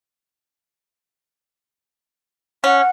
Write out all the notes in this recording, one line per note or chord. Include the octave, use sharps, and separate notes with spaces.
C#4 F#5